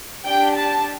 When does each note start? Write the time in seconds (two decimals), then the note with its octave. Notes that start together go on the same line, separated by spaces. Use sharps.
0.25 D4 G4 G5
0.55 A5